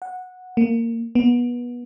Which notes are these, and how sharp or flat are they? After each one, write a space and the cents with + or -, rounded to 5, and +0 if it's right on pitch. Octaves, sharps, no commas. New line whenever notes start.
F#5 -10
A#3 -15
B3 -25